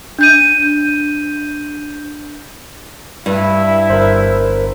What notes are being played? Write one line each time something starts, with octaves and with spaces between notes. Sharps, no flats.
D4 G6 D#7
G2 E4
G1 A#4 C5